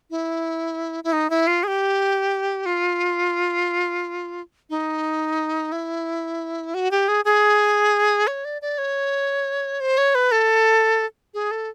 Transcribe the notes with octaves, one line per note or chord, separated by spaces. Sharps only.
E4
E4
D#4
E4
F4
G#4
G4
F4
D#4
E4
F#4
G4
G#4
G#4
C#5
D5
D5
C#5
C5
C#5
B4
A4
G#4
A4